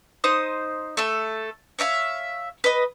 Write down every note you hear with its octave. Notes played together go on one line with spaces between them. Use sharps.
D#4 C5 D#6
A3 A4
C#5 D5 E5 F5
B4 D#5